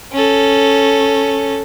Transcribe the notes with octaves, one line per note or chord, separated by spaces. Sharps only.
C#4 A4